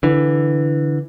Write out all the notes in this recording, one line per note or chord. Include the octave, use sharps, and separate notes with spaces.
D3 E3